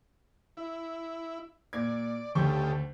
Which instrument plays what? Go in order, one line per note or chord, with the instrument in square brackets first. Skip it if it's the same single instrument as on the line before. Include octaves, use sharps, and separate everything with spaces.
[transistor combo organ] E4
[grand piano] A#2 G#6 [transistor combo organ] D5
[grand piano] D2 C#6 G6 [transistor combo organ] C#3 A3 G4